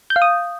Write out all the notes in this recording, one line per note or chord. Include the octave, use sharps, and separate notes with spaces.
G6
F5
D#6